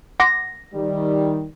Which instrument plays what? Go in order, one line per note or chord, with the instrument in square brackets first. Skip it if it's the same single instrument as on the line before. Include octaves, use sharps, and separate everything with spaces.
[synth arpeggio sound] F#5 C6 D6 [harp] A#6
[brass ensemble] D#3 G3